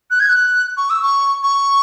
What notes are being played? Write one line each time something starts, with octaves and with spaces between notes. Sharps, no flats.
F#6
G#6
F#6
C#6
E6
C#6
C#6